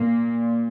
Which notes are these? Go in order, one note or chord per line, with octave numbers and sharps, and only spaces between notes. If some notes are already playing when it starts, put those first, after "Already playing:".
Already playing: A#2 A#3